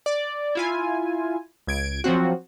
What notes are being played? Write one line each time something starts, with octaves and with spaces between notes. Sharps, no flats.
D5
E4 F4 G#5
C#2 G#6 D7
F3 F#3 C4 F#4